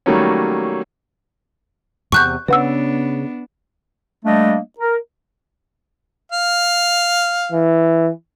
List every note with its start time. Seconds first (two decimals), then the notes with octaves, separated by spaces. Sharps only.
0.06 D#3 F#3 G3 A3 A#3 C#4
2.12 E2 C3 C#6 F#6 G6
2.48 C#3 B3 D4 B4 F#5 E6
4.25 G3 A3 A#3 D4 D#5
4.79 A#4
6.32 F5
7.52 E3